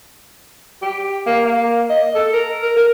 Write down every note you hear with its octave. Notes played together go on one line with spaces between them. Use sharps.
G4
A#3
A#3
D#5
A4
A#4
A#4
A#4